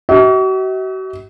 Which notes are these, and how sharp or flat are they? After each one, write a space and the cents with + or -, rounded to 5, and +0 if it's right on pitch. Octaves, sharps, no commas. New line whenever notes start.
F#4 +40 E5 -45